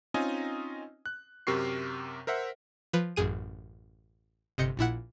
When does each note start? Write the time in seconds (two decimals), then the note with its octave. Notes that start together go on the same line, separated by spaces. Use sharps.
0.14 C4 C#4 D#4 F4 D#5 G#5
1.06 F#6
1.47 F#2 C3 G4 A#4 C#6 C7
2.27 A#4 C5 E5 F#5
2.93 F3 B4
3.16 A1 F#2 G#4 D#7
4.58 G1 C3 D#5 G6 C#7
4.77 A#1 A#2 E4 F#5